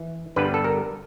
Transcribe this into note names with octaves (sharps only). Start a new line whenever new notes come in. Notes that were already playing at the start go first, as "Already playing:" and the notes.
Already playing: E3
G2 D3 G3 B3 B4
A4
A#4